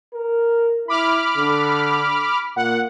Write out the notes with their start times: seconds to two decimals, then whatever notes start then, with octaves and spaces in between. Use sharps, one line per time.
0.14 A#4
0.88 E4 B5 D6 F6
1.37 D3
2.56 A#2 F#5